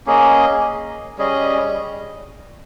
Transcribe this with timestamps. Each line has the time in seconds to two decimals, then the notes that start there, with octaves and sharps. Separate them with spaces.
0.06 A#3 C#4 G#4 D#5
1.18 G3 C#4 G#4 D#5